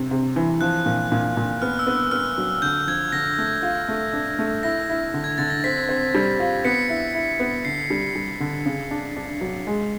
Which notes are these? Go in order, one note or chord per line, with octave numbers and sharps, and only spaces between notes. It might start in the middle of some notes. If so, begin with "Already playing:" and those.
Already playing: C3
C3
E3
F3 F#6
A#2
A#2
A#2
B3 F6
E6
B3
E6
B3 F6
F#3
D3 G6
F3 G#6
D3 A#6
A3
F4
A3
D4
A3
E4 A#6
E4
D3
G#6
D3 A6
A#6
C4 B6
C4
G3
F4
B3 B6 C#7
E4
E4
B3
D3 C7
G3
G3
D3
C#3
D4
D4
F#3
G#3